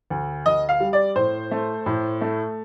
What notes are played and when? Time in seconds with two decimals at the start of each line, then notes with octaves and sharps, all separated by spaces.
0.10 D2
0.46 D2 D#5
0.69 F5
0.80 G3
0.93 D5
1.16 A2 C5
1.51 A3
1.86 A2
2.21 A3